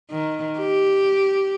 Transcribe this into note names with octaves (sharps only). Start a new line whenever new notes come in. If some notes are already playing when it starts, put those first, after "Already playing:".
D#3
G4